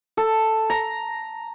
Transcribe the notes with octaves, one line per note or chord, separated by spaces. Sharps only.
A4
A#5